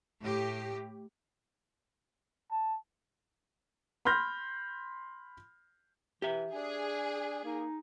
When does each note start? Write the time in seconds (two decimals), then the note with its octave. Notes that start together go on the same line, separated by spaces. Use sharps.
0.20 A2 G4
2.51 A5
4.05 B5 C6 F6 G6 A#6
6.22 E3 G4 E5
6.53 D4 G#4
7.44 A#3 D#4